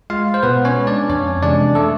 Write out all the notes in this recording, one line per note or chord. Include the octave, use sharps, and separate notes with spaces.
G#3 F4 F5
C5
B2 B3 B4
C#4 C#5
G#3
D4 D5
F2 C#4 C#5
C3 E3 G#3 D4 D5
A3 A4